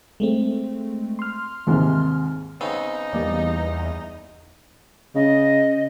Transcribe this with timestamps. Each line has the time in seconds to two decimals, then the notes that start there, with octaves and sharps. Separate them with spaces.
0.20 G#3 A3 C4
1.19 C6 F6
1.67 D#2 G#2 C3
2.61 C#3 B3 C4 D#4
3.13 E2 G3 A#3 D5
5.15 C#3 D#5